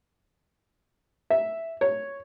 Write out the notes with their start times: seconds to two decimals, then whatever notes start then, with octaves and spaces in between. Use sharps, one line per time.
1.30 E5
1.81 C#5